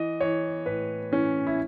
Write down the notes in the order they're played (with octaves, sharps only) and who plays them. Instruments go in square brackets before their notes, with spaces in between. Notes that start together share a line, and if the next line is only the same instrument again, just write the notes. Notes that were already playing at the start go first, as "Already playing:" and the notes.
Already playing: [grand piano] E3 D#5
E3 C#5
A2 B4
E3 C#4
E4